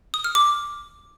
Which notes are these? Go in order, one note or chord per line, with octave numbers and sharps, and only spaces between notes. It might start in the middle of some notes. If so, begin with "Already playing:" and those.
D#6
F6
D6